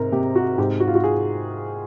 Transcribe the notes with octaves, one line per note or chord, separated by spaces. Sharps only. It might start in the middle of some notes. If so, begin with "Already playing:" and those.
Already playing: G#2 C3 A#4
C3 G4
F#4
G#2 G4
F#4
F4
F#4
G#4